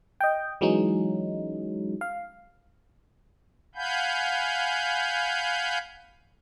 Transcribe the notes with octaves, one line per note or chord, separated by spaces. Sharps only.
D#5 G5
E3 F#3 G#3 C#4 D#4
F5
F5 F#5 G#5 B5 G6